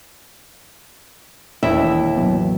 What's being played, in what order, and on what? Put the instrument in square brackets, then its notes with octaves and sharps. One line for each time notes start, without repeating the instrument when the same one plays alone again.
[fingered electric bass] E1 D4 [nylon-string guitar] D#2 E4 E5
[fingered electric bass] A1 F#3 B3